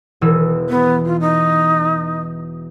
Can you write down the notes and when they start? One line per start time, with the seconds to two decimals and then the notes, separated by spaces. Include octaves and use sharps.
0.21 E1 E3 E6
0.69 B3
1.05 F4
1.20 D#4